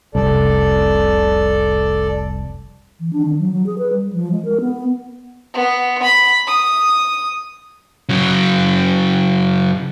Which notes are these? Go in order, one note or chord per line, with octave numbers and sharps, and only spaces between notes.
F1 C2 A4 D5
E3
D4
D#3
F#3
F#3
G#4
B4
G3
F3
G#3
A#4
B3
B3
B5
D#6
C#3 F#3